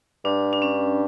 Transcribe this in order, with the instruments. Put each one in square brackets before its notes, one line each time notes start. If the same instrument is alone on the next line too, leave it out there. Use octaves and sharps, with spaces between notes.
[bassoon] G2 [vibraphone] D4
[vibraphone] D4
C#4